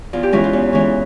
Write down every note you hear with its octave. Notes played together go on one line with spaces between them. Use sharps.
E2 F4
G4
E3 G#3 C#4 F4
F4
E2
E3 G#3 C#4